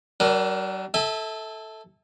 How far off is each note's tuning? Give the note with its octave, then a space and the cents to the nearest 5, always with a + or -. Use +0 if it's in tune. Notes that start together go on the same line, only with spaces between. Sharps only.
F#3 +45 D4 +0 A#4 +15
A4 +0 E5 -25 G#5 -35